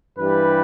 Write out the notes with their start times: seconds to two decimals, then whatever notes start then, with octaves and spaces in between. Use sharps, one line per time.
0.18 G2 E3 G3 B4